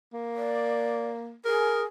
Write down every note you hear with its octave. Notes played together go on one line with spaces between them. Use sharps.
A#3
D5
G#4 A#4